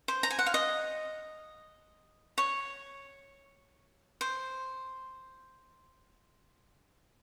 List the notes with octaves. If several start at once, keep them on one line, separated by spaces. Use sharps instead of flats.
C5
A#5
G#5
F#5
F5
D#5
C#5
C5